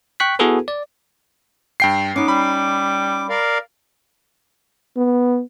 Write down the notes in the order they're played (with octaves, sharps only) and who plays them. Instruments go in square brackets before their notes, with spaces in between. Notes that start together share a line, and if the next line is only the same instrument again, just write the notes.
[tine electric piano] G5 C#6 F#6 B6
B3 E4 F#4 G#4 A4 B4
D5
[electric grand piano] G2 G5 C7
[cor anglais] B3 [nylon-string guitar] C#4 D#4 [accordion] D6
[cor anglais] G3 [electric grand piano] B5
[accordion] A#4 D5 F5
[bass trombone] B3